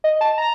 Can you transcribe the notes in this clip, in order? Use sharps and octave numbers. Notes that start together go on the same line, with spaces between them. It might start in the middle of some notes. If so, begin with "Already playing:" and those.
D#5
A5
A#5